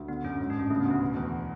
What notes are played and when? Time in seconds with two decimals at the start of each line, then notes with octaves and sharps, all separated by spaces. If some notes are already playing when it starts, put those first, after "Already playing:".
Already playing: D2
0.08 D3 B3
0.24 F#2 C#4
0.39 G#2 C#4
0.50 D4
0.55 A1 C#4
0.70 C#3 A3
0.80 B3
0.85 D2 A3
1.01 B2
1.16 E2